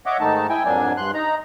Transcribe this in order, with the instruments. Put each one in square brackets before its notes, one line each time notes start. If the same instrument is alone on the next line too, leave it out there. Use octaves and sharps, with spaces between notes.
[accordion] C#5 D#5 E5 F#5 D6
G#2 D#3 A3 D#4 A5
E4 G5 G#5
F2 G#2 F#3 A#3 D4 G#5
G2 C6 F#6
D#4 A#5